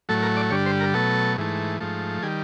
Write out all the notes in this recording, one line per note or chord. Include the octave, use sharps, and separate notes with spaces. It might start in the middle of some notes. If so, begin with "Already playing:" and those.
A2 F#3 A3 A4
A#4
D5
G2 D3 G3 C#5
C5
A#4
B2 F#3 A3 A4
G#2 E3 A3
G#2 F3 A3
D#3 G3 G#4